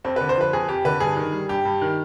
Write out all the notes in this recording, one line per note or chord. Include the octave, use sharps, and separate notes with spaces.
F2 C4
D3 B4
C5
F3 B4
F2 G#4
F2 G4
D3 B4
G2 G#4
D#3
G3
G2 G4
G2
D#3